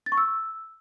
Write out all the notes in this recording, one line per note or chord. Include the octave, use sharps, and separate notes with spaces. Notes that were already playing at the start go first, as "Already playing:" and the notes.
A6
C#6
E6